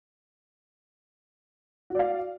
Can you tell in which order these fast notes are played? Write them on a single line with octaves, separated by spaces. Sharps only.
F#4 D5 F5